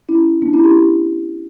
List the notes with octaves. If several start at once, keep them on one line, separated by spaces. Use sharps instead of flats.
C#4 E4
B3 D4
C#4 E4
E4 G4